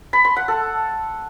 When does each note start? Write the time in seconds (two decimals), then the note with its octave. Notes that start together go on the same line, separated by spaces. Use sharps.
0.13 B5
0.25 C6
0.36 F#5
0.48 A4